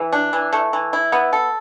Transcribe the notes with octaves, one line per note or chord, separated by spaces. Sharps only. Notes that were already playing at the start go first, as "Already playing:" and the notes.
Already playing: E3
D4
E3
A3
E3
E4
B3
A4